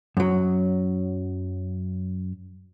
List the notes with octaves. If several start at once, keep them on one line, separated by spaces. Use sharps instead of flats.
F#2 F#3